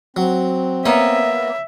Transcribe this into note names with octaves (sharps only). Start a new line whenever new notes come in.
F#3 C4
A#3 B3 C#5 E5